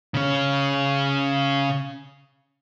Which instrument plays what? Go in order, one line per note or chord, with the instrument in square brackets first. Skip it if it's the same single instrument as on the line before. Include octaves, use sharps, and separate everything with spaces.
[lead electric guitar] C#3 C#4